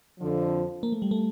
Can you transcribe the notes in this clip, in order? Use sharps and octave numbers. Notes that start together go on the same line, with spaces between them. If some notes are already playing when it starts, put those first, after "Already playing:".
F2 D3 F3
A#3
A3
G3
A3